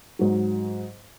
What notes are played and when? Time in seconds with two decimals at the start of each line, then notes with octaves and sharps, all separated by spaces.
0.19 G#2 F#3